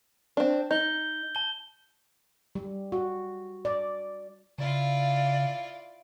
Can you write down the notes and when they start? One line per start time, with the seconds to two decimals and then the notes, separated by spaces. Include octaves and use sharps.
0.37 C4 D4
0.71 D#4 G6 G7
1.35 A5 G7
2.55 G3
2.92 F#4
3.65 D5
4.58 C#3 E4 F4 D5 F5